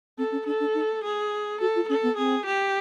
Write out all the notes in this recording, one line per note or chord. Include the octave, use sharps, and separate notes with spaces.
C4 A4
C#4
D4 A4
D4
D#4
G#4
F#4 A4
F4
C#4 A4
B3
C4 G#4
G4